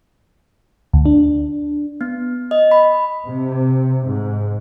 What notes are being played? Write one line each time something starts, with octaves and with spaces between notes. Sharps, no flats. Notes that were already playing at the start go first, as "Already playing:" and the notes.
D2
D4
B3
D#5
B5
C3
G#2